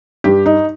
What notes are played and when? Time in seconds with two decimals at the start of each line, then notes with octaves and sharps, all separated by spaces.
0.24 G2 G4
0.46 D#4